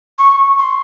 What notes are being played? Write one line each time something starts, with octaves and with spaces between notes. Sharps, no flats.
C#6
C6